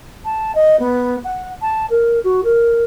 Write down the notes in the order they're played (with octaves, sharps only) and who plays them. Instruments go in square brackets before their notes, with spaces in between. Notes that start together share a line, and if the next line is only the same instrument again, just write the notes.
[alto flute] A5
D#5
B3
F#5
A5
A#4
F#4
A#4